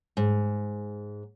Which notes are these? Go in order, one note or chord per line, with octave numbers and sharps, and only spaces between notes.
G#2